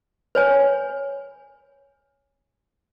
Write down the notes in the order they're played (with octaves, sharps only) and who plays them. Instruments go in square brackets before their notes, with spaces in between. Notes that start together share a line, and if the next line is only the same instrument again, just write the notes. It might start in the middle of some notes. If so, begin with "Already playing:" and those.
[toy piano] B4 C#5 G#5